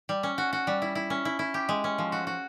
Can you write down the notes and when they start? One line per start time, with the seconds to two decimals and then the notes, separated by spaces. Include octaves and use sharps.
0.09 G3
0.23 C#4
0.38 F#4
0.53 F#4
0.67 G3
0.82 E4
0.95 E4
1.10 C#4
1.25 E4
1.39 E4
1.54 G4
1.69 G#3
1.84 C#4
1.98 F3
2.12 F#4
2.27 F#4